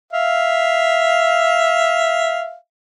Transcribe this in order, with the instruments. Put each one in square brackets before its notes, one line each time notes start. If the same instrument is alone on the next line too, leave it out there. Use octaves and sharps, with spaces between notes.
[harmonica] E5 F5